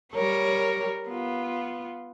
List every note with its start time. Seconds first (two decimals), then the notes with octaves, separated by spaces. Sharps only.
0.14 G3 A#4 C#5
1.08 B3 F4